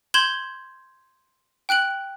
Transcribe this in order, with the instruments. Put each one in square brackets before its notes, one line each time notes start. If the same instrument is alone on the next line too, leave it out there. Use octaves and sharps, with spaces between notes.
[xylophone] C6 G6 G#6 E7 F#7 G7
G5 F#6 D7 F#7